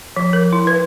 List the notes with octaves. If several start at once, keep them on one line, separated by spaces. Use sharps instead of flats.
F3
A#4
E4
B4